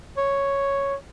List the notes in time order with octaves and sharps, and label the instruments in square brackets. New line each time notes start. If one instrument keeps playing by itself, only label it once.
[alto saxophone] C#5